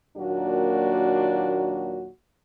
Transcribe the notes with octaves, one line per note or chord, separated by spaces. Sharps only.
D#2 A#2 F#3 A#3 D4 F#4